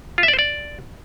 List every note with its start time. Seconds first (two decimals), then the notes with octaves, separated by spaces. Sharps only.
0.18 F4
0.23 E5
0.28 D5
0.33 C5
0.39 D5